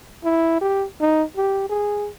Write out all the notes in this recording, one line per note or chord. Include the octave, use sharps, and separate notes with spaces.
E4
G4
D#4
G4
G#4